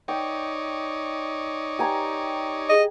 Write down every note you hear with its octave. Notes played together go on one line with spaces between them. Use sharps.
D#4 C#5 D5 G5
G4 G#5 A#5
G#4 D#5